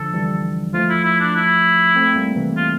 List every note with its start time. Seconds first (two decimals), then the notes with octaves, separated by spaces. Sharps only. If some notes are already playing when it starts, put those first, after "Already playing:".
Already playing: D3 F3 A4
0.14 E3 G3
0.74 F3 A3 F4
0.89 E4
1.04 E4
1.20 D4
1.35 E4
1.96 A3 C4
2.16 G3 A#3
2.36 C3 E3
2.57 F4